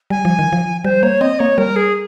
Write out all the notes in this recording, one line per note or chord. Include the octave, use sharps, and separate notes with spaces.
G3 G#5
F3
D#3
F3
G3 C5
A#3 C#5
C4 D#5
A#3 C#5
G3 A#4
G#4